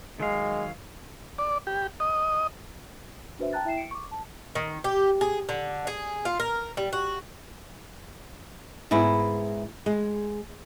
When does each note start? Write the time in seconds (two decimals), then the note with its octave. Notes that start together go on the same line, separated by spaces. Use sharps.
0.20 D#3 F#3 G#3 F5
1.39 D5
1.67 G4
2.00 D#5
3.39 D4 F#4 B4 C5 E5
3.53 G5 A5 A#5 F#6 A6
3.65 E4 E5 G5 C7 E7
3.77 C#7 D7
3.91 C#6 D6
4.11 A5
4.55 D#3
4.84 G4
5.21 G#4
5.49 D3
5.87 G#4
6.25 F4
6.40 A#4
6.77 G3
6.93 F#4
8.91 G#2 G#3 B3 E4
9.86 G#3